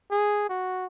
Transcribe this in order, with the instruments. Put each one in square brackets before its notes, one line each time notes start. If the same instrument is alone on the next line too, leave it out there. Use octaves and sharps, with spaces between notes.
[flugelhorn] G#4
F#4